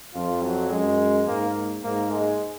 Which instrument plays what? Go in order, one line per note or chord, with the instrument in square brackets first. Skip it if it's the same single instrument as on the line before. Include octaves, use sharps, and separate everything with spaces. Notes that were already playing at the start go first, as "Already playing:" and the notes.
[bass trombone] F2 [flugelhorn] F4
[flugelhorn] F#3
[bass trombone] F#2 [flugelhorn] G#3
[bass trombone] G#2 [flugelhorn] A#3
[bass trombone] G#2 [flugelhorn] A#3
[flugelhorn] G#3